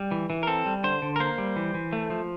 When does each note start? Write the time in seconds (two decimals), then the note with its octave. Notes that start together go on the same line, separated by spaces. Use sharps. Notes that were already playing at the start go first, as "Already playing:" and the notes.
Already playing: G3
0.11 E3
0.30 E3
0.43 A#4
0.47 C4 A4
0.66 G3
0.84 D3 C5
1.02 D3
1.16 A#4
1.20 A#3 C5
1.38 G3
1.56 E3
1.74 E3
1.93 A3
2.10 F3